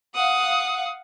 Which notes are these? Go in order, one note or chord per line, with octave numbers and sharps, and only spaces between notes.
F5 F#5 D#6